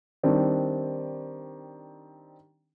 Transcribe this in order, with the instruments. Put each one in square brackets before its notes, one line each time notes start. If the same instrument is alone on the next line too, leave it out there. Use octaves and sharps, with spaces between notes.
[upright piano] D#3 G3 C4 D4